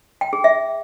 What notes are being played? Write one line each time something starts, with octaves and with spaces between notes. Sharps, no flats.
G5
G#4
E5